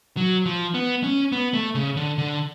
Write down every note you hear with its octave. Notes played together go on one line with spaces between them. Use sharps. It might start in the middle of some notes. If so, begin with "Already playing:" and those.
F#3
F3
B3
C#4
B3
A3
C#3
D3
D3